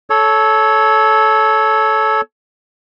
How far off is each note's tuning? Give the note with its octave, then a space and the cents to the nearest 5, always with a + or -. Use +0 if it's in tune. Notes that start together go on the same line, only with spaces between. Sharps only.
A4 -15 C#5 +10